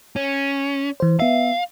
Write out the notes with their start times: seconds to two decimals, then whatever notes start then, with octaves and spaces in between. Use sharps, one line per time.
0.16 C#4
1.00 E3 C5
1.20 B3 E5 F5